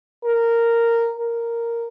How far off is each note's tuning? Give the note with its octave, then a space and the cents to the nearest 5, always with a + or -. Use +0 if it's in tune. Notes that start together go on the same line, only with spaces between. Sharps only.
A#4 -10
A#4 -5